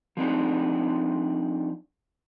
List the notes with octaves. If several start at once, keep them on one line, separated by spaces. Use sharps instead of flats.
F3 C4 D4 D#4